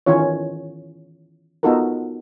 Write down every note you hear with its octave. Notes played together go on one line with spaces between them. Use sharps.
D#3 E3 C#4 F4 C#5
B3 D#4 F4 F#4 A4 A#4